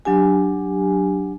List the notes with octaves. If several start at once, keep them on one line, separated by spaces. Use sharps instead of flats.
F#3 D4 G4 G#5